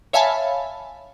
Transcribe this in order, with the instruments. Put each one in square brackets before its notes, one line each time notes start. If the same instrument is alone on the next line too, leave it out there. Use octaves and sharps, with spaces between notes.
[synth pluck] C#5 E5 F5 G#5 A5 B5